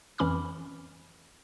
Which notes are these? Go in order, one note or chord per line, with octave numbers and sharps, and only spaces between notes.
F2 E3 C#4 B5 D6 F6